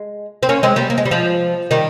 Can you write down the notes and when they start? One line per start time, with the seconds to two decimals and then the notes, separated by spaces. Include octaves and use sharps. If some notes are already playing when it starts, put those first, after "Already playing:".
Already playing: G#3
0.43 C4
0.49 A#3 C#4
0.63 G#3 C4
0.76 G3 A#3
0.90 A#3
0.98 G#3
1.05 G3
1.11 F3 G#3
1.71 D#3 G3